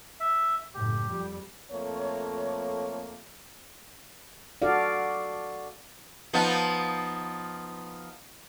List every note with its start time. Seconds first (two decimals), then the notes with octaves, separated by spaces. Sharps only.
0.20 E5
0.74 F#1 A2 G4
1.08 F2 G3
1.71 F2 A3 A#3 C#5
4.62 F#4 A4 D5 F5
6.33 F3 B3 D#4